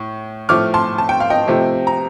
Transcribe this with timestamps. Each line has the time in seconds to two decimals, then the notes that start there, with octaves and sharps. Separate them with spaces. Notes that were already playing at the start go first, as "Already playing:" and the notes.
Already playing: A2
0.49 A2 F3 A3 D6 F6
0.74 A5 C6
0.98 A5
1.09 G5
1.20 F5
1.30 D#5 G5
1.48 C3 F3 A3
1.87 A#5